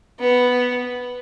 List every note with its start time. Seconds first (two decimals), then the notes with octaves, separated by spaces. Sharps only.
0.19 B3